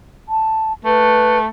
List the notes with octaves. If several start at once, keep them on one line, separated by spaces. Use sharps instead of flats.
A5
A3 B4